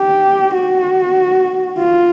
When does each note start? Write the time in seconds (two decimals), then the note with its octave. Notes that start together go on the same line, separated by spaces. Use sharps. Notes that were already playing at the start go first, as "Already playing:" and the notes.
Already playing: G4
0.54 F#4
1.78 F4